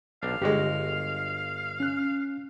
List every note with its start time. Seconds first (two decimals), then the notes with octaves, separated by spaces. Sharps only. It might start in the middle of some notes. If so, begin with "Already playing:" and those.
0.23 B1 D4 F5
0.42 G1 G#3 F#4 G4
1.80 C#4 F#6